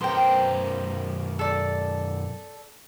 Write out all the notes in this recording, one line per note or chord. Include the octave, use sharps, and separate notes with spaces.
F#2 B2 A#4 C5 G5
A4 D5